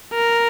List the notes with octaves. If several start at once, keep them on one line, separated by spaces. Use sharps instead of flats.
A#4